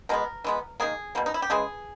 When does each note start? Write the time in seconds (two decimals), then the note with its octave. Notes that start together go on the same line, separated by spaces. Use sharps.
0.09 B2 G#3 B3 A#4
0.44 E3 G#3 B3
0.80 D#3 A#3 G#4
1.15 B2 G3 A#3
1.26 D#4
1.34 E4
1.42 G4
1.50 C#3 E3 G#3 G#4